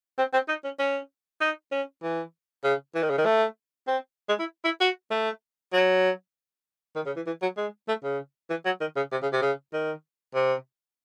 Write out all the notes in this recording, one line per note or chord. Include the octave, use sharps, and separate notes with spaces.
C4
C4
D#4
C#4
C#4
D#4
C#4
E3
C#3
E3
D#3
C#3
D#3
A3
C4
G#3
E4
E4
F#4
A3
F#3
D#3
C#3
E3
E3
F#3
G#3
A3
C#3
E3
F#3
D#3
C#3
C3
C#3
C3
C#3
D#3
C3